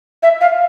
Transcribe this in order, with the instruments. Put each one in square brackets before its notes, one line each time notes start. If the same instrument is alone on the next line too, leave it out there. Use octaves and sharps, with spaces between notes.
[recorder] E5
F5